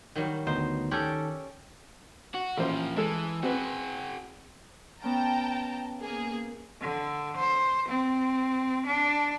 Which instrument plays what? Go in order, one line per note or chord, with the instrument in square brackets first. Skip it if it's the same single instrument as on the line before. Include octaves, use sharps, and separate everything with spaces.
[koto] D#3 F#3 G3
[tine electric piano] D2 B3 D#4 [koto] C5
[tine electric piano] D#3 A4 [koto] C#4 G4 D5
[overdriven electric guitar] F#4
[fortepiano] A1 C5 [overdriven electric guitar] F3 A#3
[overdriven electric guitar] E3 [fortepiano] G#3 A4
[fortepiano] C4 B4 [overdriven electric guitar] F#4 G#4
[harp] B3 C#4 F5 [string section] G5 A5 A#5
[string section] A#3 G#4
[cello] D3
C5
C4
D4